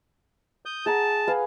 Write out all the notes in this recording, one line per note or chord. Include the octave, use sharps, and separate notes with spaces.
D#6 G6
G#4 F#5 A5 A#5
B4 F5 G#5